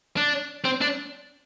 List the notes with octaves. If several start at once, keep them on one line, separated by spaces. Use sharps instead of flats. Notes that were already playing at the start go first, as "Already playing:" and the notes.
D4
C4
D4